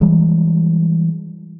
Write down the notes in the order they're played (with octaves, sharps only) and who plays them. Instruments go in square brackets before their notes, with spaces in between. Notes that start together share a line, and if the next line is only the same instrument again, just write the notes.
[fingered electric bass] E3 G3 G#3